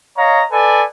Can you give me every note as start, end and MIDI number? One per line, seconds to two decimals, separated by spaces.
0.17 0.43 73
0.17 0.43 75
0.17 0.43 77
0.17 0.43 82
0.52 0.83 69
0.52 0.83 71
0.52 0.83 74
0.52 0.83 80